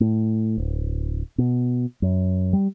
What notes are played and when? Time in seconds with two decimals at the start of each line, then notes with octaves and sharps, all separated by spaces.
0.01 A2
0.58 D1
1.38 B2
2.02 F#2
2.53 G3